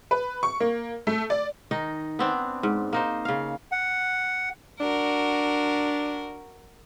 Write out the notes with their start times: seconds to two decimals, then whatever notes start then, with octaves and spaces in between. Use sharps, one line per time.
0.11 B4
0.43 C#6
0.60 A#3
1.07 A3
1.30 D5
1.71 D#3 D#4 D#5
2.19 B3 C4 D4
2.63 G#2
2.93 A#3 D#4 C5
3.25 C#3 F5
3.72 F#5
4.80 D4 F#4 A#4